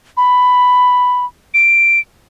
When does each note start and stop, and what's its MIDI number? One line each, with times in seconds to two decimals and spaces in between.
0.17 1.25 83
1.54 1.99 98